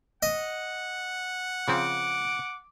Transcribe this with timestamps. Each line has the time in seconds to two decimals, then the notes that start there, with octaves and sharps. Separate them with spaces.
0.23 D#5 F#5
1.68 C#3 F3 C4 D6